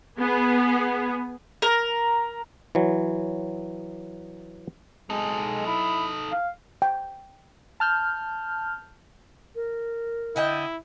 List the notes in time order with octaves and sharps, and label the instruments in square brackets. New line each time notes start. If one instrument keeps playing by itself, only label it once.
[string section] B3 G#4
[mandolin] A#4
[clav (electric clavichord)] E3 F#3
[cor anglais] G#3 [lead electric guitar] D#4 A4
[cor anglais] E4
F5
[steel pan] G5
[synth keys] A5 F6 G6
[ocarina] A#4
[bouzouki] D3 D#5 G5 [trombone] E4